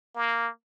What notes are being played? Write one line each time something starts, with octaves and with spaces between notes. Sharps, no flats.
A#3